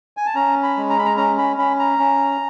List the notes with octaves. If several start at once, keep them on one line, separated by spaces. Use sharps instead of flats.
G#5
A5
C#4 A#5
B5
G#3
A#5
B5
A#5
C#4 A#5
B5
C#4 B5
A#5
C#4